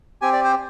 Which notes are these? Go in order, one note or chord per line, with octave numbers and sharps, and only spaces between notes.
C4 G4 G#5
D5
C5